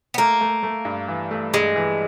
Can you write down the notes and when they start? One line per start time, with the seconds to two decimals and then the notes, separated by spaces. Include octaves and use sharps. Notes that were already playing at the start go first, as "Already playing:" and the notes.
0.14 B3
0.18 A3 A#3
0.41 A3
0.63 A3
0.85 G2
1.08 E3
1.31 A3
1.53 G2 G#3
1.76 E3